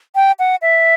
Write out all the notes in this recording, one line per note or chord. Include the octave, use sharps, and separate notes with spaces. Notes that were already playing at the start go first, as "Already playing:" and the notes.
G5
F#5
E5